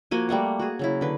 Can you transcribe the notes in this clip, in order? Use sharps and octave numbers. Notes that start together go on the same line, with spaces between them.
F3 A#3 F#4 G#5
G3 A3 A#3 F#5
F#4 G#4
C#3 F#3 E4
D3 B4